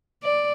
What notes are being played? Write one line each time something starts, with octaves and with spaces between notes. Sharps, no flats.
D5